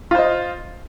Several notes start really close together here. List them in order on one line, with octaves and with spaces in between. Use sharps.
F4 C5 D#5